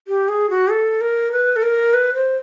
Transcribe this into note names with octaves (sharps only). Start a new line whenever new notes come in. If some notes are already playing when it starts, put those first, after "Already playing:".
G4
G#4
F#4
A4
A#4
B4
A4
A#4
B4
C5